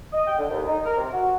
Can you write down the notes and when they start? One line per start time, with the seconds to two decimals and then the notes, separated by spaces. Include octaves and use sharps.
0.13 D#5
0.27 G5
0.39 D3
0.50 D#2
0.67 D#4
0.86 A#4
0.97 C3
1.13 F#4